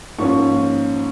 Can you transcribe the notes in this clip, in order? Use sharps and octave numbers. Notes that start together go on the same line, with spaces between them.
G#2 F3 A#3 C#4 C#6